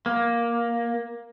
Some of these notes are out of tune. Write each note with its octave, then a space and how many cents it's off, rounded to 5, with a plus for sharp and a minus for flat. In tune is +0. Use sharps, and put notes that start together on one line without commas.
A#3 +10